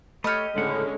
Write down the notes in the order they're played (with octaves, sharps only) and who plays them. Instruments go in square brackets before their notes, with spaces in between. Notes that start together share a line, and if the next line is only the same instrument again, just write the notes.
[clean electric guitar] A3 A4 C#5 [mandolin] G4 D#5 [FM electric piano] B5 D#6 F6
[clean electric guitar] C#2 A2 F#5 [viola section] D3 G#3 C#4